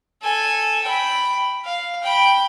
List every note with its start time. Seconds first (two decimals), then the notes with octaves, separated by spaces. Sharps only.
0.22 A4 G#5
0.83 G5 B5
1.65 F5
2.03 G5 B5